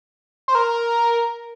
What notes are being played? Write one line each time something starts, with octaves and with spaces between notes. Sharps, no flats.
C5
A#4